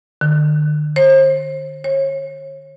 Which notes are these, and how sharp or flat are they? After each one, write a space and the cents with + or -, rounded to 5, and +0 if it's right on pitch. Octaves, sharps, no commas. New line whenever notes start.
D3 +45
C5 +35
C#5 -30